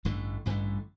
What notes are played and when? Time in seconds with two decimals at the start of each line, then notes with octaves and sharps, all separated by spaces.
0.05 A1 G2 D3 A3
0.46 A1 G2 D3 A3